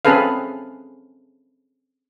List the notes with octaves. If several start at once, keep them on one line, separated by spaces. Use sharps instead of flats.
C4 C#4 G#4 A4 B4 F5